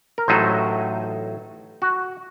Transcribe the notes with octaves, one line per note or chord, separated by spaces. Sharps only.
A#4
A1 A2 F#3 A3 D#4 C5
F#4